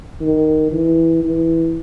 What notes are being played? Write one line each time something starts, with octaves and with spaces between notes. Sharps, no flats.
D#3
E3
E3